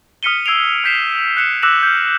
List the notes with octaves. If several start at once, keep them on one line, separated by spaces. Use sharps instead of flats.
D#6 F6 B6 C#7 D#7 G7
E6 G#6 C7 D7 F7
F6 G6 B6 C7 E7
F#6 C#7 E7
D6 E6 F#6 A#6 E7 F#7
F6 G6